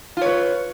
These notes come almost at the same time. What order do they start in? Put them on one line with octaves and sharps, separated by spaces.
F4 C#5 B4